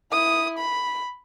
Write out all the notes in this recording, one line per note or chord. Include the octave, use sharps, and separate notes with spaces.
E4 D#6
B5